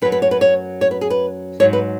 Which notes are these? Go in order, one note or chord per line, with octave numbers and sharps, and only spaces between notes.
F#2 F#3 B4
B4
C#5
B4
C#5
C#5
B4
G#4
B4
G#2 F#3 C#5
B4